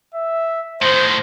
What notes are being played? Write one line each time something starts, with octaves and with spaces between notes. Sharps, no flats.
E5
A2 D#3 C5